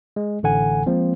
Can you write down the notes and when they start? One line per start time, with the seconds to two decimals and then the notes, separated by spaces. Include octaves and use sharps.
0.16 G#3
0.43 A1 D3 A4 F#5 G#5
0.86 F3 G#3 A#3 C4